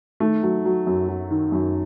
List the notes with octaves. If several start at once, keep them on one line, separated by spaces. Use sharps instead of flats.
D#3 A3
F#3
F#3
F#2
F#3
D#3
F#2